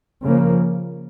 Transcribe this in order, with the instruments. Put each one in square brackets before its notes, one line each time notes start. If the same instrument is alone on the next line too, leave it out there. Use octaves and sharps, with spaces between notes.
[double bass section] C#3 F3 A#3